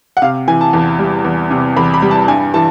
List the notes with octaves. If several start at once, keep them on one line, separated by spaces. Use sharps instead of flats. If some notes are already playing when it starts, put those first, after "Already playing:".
F#5
C3 F5
E3 G#5
A5
E2
G3
E2
C3
E2 B5
B5
G3
A5
G2 G#5
E3 A5